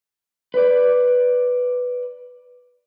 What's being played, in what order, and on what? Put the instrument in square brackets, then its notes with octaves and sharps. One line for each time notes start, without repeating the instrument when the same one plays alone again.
[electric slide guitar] B4 D5